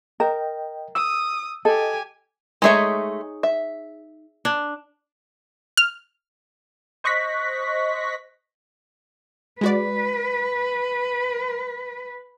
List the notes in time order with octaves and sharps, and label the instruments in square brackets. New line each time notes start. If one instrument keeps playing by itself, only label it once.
[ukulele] A#4 [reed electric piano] D#5 G5
[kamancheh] D#6 [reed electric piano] E6
[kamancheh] G4 G#5 [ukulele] A4 [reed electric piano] D#5
[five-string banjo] G#3 A3 E5 [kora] D#4 G#4 C#5
[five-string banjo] E5
[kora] D4
[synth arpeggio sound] F6
C5 D#5 C#6 F#6 A#6 B6
[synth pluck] G#3 F#4 D5 [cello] B4